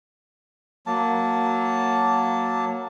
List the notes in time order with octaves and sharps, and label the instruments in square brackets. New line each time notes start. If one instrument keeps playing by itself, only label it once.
[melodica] F#3 A#3 A5